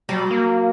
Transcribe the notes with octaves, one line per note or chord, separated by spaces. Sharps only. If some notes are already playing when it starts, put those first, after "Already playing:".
F#3 G3
A#3